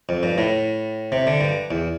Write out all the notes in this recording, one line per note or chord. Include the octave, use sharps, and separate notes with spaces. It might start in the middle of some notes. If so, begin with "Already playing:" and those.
F2
G2
A2
C3
D3
G2
E2